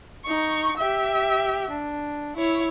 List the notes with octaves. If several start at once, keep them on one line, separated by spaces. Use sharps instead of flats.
D#4 C#6
G4 E5
D4
E4 C#5